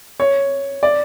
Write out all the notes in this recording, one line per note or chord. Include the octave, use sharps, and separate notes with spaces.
C#5
D5